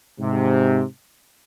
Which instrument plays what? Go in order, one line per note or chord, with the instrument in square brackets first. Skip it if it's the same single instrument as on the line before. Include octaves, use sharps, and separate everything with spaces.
[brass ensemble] G#2 C3